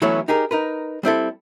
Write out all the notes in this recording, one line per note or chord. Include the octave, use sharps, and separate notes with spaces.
E3 F#3 A3 B3 C#4 E4
D#4 G4 G#4 A#4
D#4 A#4 B4
G3 C4 E4 A4